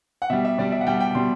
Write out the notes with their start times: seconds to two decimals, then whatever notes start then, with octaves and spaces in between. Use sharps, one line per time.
0.22 F#5
0.30 B2 G3 E5
0.45 E5
0.58 B2 G3 D5
0.72 E5
0.81 F#5
0.87 B2 G3 G5
1.00 G5
1.15 B2 G3 C6